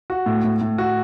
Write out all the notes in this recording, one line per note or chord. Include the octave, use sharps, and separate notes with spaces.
F#4
A2
A2
A2
F#4